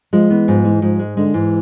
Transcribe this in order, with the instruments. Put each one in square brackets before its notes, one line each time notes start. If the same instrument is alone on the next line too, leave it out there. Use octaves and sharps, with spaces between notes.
[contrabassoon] F3 [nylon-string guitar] G#3
[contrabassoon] E3 [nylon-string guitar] B3
[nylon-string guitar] G#2 [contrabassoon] F3
[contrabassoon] E3 [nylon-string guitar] G#3
[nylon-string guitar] G#2 [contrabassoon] F3
[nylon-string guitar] G#3
[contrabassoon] D3 [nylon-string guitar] G#3
[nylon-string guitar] G#2 [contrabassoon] E3